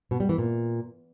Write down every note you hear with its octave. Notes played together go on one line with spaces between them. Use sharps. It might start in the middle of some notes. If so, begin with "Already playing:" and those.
B2
G3
E3
A#2